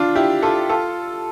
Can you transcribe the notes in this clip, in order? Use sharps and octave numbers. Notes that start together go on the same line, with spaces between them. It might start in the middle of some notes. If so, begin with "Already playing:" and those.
Already playing: D4 F4
E4 G4
F4 A4
F4 A4